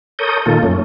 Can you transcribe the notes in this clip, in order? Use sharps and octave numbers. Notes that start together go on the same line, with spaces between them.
A4 A#4 C#5 D#6 G6
A#2 D#3 A3 A#3 F4 A4
F#2 A3 C#4